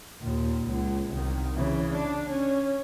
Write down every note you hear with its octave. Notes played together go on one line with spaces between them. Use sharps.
D#2 A#2
C#2
C2 D#3
C#3 E3
D4
C#4